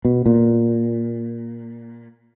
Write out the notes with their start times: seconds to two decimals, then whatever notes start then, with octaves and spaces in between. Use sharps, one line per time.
0.05 B2
0.26 A#2